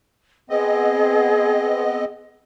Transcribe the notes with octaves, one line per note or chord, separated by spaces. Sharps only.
B3 C4 G#4 D#5